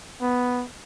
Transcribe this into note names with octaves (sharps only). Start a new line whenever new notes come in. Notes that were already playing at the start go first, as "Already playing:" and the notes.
B3